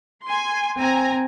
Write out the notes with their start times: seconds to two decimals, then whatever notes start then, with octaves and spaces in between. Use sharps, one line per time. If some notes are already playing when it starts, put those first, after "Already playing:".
0.24 G#5 C6
0.77 C4 G#5 A#5